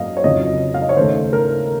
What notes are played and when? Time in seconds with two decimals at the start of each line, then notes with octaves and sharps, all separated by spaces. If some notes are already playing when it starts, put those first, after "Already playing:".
Already playing: F#2 F#3 A#3 D#5 F5
0.17 C#5
0.24 F2 C#3 F#3 D#5
0.74 F5
0.82 D#5
0.89 C#5
0.96 D#2 C#3 A3 C5
1.33 A#4